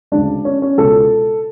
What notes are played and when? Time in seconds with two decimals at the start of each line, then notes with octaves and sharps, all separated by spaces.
0.12 D2 C#3 G#3 D4
0.45 C#4
0.62 C#4
0.77 C#2 B2 G#3 A4